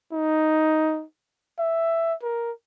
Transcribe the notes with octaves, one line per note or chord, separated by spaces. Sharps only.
D#4
E5
A#4